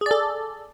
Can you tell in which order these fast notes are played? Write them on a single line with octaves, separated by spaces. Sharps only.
G#4 D5 A4